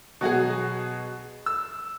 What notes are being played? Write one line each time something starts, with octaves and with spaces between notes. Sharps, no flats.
B2 F#3 F#4 G#4
E6